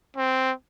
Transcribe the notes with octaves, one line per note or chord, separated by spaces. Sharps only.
C4